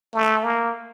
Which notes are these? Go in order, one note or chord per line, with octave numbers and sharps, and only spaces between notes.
A3
A#3